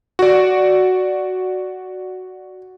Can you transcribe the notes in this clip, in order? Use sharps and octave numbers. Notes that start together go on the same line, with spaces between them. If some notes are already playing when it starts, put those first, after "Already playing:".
F#4 D5